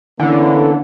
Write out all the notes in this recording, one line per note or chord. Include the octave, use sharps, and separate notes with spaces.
D3 E3 A#3 B3 C#4